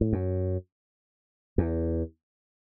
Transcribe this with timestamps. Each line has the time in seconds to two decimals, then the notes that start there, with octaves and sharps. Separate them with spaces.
0.01 A2
0.13 F#2
1.58 E2